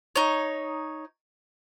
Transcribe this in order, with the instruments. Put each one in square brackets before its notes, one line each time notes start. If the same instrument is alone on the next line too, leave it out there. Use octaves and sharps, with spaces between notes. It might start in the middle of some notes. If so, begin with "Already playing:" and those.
[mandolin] D#4 C#5